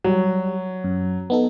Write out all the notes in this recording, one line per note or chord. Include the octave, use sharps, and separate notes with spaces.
F#3 G3
F#2
B3 D#4 A4